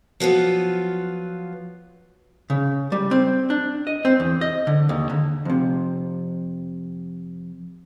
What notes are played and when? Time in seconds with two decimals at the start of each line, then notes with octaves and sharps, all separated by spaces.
0.20 F3 F#3 B3 F4
2.50 C#3
2.92 G3
3.11 C4
3.50 D4
3.87 D#5
4.05 C4
4.20 E2
4.41 D#5
4.67 D3
4.89 D#2
5.10 D3
5.45 F2 C3